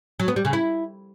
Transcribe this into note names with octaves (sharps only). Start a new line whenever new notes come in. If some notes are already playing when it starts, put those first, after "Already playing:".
F#3
B3
G3
C#3
E4